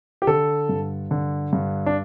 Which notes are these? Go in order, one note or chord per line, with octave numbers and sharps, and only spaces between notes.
G4
D3 A4
G2
D3
G2
D4